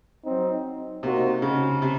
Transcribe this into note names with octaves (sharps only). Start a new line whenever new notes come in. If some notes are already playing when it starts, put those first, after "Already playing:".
F#3 C4 D#4
C3 A#3 D#4 F#4 C5
C#3
C3